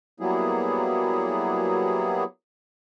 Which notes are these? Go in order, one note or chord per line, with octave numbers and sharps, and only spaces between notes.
F#3 G3 A#3 B3 E4 G#4